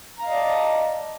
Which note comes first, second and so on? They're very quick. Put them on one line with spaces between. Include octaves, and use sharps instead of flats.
A#5 F5 D#5 D5 A5